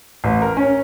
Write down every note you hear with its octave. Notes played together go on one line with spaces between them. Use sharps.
A1
A#4
C#4